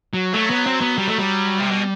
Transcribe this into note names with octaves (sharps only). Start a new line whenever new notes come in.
F#3
F#3 A3
B3
C4
B3
G3
A3
G3
C3
B2